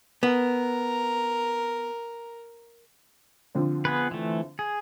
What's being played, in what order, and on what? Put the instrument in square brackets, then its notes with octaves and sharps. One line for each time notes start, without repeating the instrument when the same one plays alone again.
[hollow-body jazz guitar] B3 [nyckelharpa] A#4 A#5
[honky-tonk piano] D3 F3 C4
[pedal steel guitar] B3 G#4 B4
E3 A3
G#4